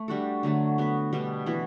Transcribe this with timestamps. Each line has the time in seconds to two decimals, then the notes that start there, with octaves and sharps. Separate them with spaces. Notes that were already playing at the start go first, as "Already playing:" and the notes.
Already playing: A3
0.08 G3 D4 F#4 A4
0.43 D3 F#3 A3
0.78 B3 F#4 B4
1.13 B2 G3 B3 D4
1.46 E3 B3 F#4 B4